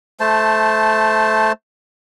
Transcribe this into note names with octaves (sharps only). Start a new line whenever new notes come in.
A3 C5 A5